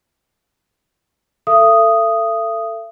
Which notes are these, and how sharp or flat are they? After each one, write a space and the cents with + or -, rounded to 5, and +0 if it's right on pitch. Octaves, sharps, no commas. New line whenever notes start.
A4 +20 E5 +45 D#6 +0